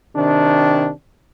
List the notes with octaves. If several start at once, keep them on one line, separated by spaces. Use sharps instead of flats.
C3 D#3 D4